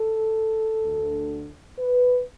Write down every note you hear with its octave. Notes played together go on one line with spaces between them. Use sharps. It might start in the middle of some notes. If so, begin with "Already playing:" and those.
Already playing: A4
D2 D3
B4